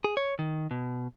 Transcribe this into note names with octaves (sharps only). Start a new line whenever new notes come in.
G#4
C#5
D#3
B2